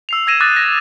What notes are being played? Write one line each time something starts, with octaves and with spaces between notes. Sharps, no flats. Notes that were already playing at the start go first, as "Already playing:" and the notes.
E6 C7 F7
E6 G#6 A#6 D#7 E7
D6 D#6 F#6 A6 A#6
A#6